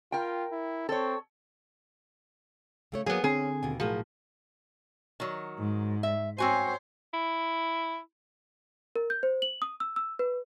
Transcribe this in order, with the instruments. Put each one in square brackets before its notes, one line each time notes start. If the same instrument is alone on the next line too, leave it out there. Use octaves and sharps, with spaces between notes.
[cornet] F4 [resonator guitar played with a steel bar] A#4 G5
[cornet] E4
[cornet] C4 [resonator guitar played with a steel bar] A4 C#5
[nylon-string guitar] C#3 A3 C#5
[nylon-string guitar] F#3 A#3 [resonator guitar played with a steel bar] B3 G#4
[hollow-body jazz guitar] D3 C4 A#5 [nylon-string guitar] C#4 [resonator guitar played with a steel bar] G#4
[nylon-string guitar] D#2 B2 G#5
[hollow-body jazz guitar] B1 A2 [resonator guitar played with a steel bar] F3 [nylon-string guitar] F#4 G#4 A#4
[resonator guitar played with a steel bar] D#3 F#3
[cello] G#2
[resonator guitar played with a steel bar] E5
[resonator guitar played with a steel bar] C4 F#4 G#5 [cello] C5 C#5
[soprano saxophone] E4
[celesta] A#4
G6
C5
F#7
D#6
E6
E6
B4